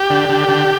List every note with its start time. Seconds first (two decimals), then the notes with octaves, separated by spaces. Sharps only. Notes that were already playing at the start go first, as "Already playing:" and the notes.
Already playing: G4
0.10 D3
0.29 D3
0.49 D3